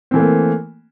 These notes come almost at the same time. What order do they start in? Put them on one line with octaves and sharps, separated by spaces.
C4 E3 A3 A#3